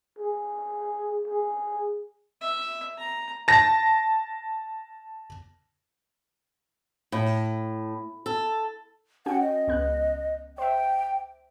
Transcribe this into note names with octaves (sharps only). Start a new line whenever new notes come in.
G#4
G#4
E5
A#5
A5 A#6
A2
A4
C#4 F#4 F#5 G5
D#5
C#2 B3 F#6
C5 E5 G5